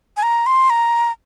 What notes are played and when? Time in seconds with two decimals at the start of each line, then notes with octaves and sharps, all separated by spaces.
0.17 G#5
0.23 A#5
0.46 C6
0.70 A#5